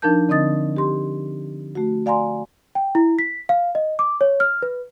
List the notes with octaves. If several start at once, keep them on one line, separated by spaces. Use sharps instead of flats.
F3 D4 D#4 A#4 A5 G6
D3 C4 D#5 D#6 A6
G4 C6
A3 F#4
D5 F5 G#5 A#5 C6
G5
E4
B6
F5
D#5
D6
C#5
F6
B4